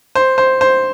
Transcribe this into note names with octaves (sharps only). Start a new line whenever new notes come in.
C5
C5
C5